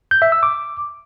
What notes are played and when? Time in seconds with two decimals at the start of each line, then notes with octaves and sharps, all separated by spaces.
0.11 G6
0.22 E5
0.32 E6
0.43 D6